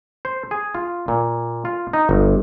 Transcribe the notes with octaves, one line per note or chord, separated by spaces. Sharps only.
C5
G#4
F4
A#2
F4
D#4
G1